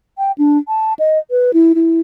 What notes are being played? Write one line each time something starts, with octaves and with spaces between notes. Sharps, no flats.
G5
D4
A5
D#5
B4
E4
E4